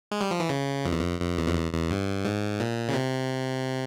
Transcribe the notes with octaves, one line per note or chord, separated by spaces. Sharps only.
G#3
G3
F3
E3
C#3
F2
E2
F2
F2
E2
F2
E2
E2
G2
G#2
A#2
C#3
C3